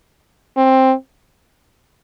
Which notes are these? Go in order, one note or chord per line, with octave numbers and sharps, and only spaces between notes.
C4